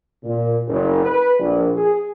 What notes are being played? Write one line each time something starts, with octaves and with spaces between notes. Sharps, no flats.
A#2
F#1
B4
A#1
G#4